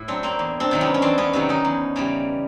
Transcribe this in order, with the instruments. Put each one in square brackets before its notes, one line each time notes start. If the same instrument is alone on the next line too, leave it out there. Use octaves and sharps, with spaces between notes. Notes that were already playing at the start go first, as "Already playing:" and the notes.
Already playing: [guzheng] A2 E4
F#3 C4 D4
A#3 C4
E2
C4 D4
C3 D#3 F#3
B3 C#4
C#4
E2 C4 D4
B3 C#4
C3 D#3 F#3
C#4 D#4
E2
C#3 E3 G3